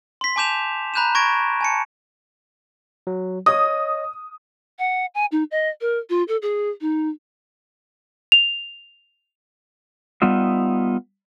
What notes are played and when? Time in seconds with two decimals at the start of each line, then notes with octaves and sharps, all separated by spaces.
0.21 C6 B6
0.36 G#5 A5 D6 G6 E7 F7
0.94 A#5 B5 F#6 G6 D#7 E7
1.15 C#6 G#6 A#6 D7
1.61 G#5 A5 C#7
3.07 F#3
3.46 C#5 D#5 D#6
4.79 F#5
5.14 G#5
5.32 D#4
5.51 D#5
5.81 A#4
6.10 F4
6.28 A4
6.42 G#4
6.81 D#4
8.32 F7
10.22 G3 B3 D#4 F4 E5